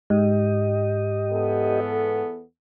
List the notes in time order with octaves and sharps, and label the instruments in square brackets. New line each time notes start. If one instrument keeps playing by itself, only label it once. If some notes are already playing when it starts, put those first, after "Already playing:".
[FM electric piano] G#2 [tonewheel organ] G4 D#5
[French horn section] E2 B3 A4